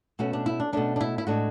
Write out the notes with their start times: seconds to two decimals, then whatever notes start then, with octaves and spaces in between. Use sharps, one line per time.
0.19 B2 A3 C#4 F#4
0.33 D4
0.46 E4
0.60 D4
0.73 B2 A3 C#4 D4
0.96 D4
1.01 E4
1.18 E4
1.27 A2 G#3 D4 F#4